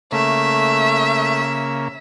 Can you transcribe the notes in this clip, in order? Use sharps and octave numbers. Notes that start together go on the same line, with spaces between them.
C#3 A3 A#3 E5